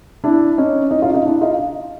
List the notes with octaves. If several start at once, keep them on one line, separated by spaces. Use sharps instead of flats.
D4 E4
C#4 D#4
C#4 D#4
D#4 F4
D#4 F4
D4 E4
D#4 F4